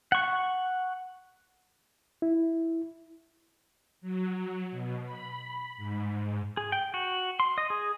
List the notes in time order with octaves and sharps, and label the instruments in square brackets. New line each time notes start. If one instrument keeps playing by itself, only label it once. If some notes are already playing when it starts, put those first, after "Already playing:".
[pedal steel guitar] F#5 C#6
[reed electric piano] E4
[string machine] F#3
B2
B5
G#2
[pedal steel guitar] G#4
G5
F#4
C6
D#5
G#4